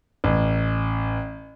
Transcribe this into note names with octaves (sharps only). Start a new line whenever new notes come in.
A1